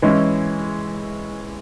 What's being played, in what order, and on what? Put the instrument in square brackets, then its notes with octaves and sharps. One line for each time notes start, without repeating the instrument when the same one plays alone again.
[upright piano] E3 G#3 C#4 E4